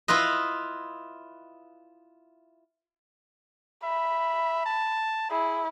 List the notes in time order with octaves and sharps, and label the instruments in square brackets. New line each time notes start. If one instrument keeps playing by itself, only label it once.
[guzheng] E4 F4 B4 D#5
[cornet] E5 [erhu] B5
[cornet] A5
[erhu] E4 [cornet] G#4